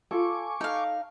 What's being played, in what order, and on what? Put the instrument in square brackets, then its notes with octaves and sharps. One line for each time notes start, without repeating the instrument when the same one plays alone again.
[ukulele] F4 A4 [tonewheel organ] G#5 C#6 D6
[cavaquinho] D#4 F5 [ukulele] A4